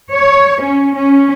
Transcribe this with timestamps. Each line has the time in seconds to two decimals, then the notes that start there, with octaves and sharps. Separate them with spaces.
0.13 C#5
0.63 C#4
0.95 C#4